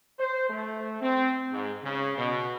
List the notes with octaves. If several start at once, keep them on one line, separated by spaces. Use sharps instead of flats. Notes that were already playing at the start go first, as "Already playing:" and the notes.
C5
A3
C4
G#2
C#3
B2